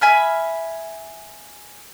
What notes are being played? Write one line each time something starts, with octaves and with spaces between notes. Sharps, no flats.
E5 G#5 B5 F6